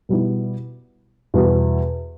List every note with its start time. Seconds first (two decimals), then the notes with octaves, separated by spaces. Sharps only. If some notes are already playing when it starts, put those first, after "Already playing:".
0.09 B2 G3 B3 E4
1.34 E2 B2 G3 B3